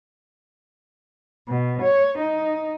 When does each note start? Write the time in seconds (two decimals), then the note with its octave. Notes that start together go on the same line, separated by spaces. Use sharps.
1.47 B2
1.82 C#5
2.18 D#4